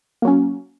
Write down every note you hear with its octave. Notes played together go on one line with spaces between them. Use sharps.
F#3 A#3 C#4